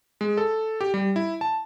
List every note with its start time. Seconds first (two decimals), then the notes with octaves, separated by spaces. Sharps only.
0.21 G#3
0.37 A4
0.81 G4
0.94 G3
1.16 E4
1.41 A5